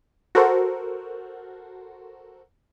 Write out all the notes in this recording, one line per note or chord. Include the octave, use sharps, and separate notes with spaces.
F#4 A4 A#4 C5